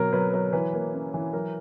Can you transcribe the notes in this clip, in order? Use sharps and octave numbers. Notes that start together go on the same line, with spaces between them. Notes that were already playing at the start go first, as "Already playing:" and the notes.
Already playing: B2 F#3 A#4
F#3 B4
F#3 A#4
E3 B4
A#3
C#4
E3
F#3 A#4